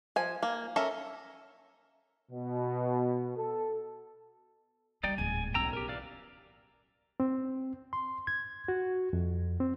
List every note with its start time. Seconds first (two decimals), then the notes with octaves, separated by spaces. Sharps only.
0.16 F3 G#5
0.43 A#3
0.76 C#4 A4 A#4 E5
2.31 B2
3.37 A4
5.03 G3 D#4 D5 G5
5.18 D1 G#2 G#5
5.54 B1 C#4 G5 A#5 E6
5.73 G4 A#4
5.89 E3 D5 F5
7.20 C4
7.93 C6
8.27 G#6
8.68 F#4
9.13 F2
9.60 C4